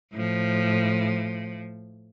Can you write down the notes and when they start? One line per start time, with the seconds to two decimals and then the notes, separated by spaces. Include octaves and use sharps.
0.12 A2 F3